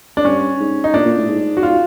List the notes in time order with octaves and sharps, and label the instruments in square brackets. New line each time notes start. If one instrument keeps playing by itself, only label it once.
[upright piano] D4
[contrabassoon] G2 [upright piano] C#4
[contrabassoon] G#2
[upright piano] D#4
[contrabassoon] A#2 [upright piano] D4
[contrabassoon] A#2
A2
G#2
[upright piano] F#4
F4